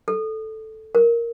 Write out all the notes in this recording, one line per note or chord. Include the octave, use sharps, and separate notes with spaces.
A4
A#4